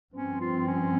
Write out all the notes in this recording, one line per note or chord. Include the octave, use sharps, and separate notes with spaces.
G2 F3 C4 C#4
F4
C#4